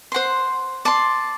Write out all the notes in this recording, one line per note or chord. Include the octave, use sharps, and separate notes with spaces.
C5 F#5 C6
D5 A5 C6